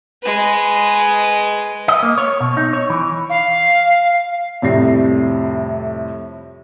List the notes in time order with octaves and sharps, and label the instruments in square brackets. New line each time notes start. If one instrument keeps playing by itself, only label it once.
[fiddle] G#3 B4
[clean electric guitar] D#5
A#3
C#5
B2
D#4
C#5
E3
[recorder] F5
[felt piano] F2 A2 C3 G3 A#6 C7